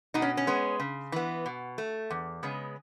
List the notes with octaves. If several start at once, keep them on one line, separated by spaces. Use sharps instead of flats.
B2 D#4
C#4
C#4
G#3 B3
C#3
E3 B3
B2
A3
E2
C#3 G#3 B3